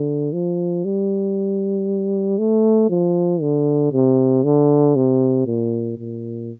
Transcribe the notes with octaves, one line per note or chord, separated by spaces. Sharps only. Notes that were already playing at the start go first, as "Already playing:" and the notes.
Already playing: D3
F3
G3
A3
F3
D3
C3
D3
C3
A#2
A#2